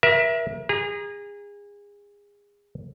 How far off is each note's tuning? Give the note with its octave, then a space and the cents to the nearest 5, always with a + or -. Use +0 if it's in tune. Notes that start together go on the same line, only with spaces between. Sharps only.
A#4 +40 E5 +0
G#4 -30 A#5 +15